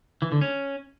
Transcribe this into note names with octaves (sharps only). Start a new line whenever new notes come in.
E3
D3
C#4